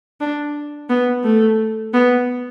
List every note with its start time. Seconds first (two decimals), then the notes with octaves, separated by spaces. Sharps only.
0.21 D4
0.89 B3
1.24 A3
1.93 B3